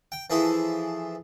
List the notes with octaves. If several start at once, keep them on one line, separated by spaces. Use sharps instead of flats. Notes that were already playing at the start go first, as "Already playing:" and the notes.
G5
E3 F3 E4 G#4 A4